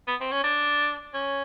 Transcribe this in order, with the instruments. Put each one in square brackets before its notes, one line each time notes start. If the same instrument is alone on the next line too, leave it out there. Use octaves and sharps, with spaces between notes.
[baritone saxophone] B3
C4
C#4
D4
C#4